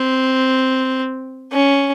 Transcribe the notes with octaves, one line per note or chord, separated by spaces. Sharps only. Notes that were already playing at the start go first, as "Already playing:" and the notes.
Already playing: C4
C#4